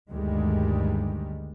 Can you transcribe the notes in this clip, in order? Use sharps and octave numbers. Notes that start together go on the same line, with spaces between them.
G1 D2 G2 D#3 G3 G#3